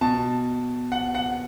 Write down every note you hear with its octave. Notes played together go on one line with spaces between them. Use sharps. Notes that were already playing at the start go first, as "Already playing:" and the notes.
B2 A5
F#5
F#5